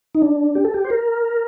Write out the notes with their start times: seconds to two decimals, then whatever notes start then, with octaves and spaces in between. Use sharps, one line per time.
0.15 D#4
0.22 D4
0.55 G4
0.65 A4
0.74 G4
0.84 C5
0.90 A#4